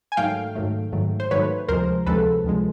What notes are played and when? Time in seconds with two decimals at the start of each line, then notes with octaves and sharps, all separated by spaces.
0.12 G#5
0.17 G#2 D#3 F#3 A3 F5 G5
0.55 G#2 D#3 F#3 A3
0.93 G#2 D#3 F#3 A3
1.20 C5
1.31 G#2 D#3 F#3 A3 B4 C#5
1.68 D2 C3 F3 G#3 A#4 C5
2.06 D2 C3 F3 G#3 A4 B4
2.44 D2 C3 F3 G#3